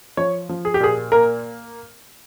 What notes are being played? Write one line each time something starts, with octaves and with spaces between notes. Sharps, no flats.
F3 C#5
F3
G#4
G4
A#2 G#4
A#3 A#4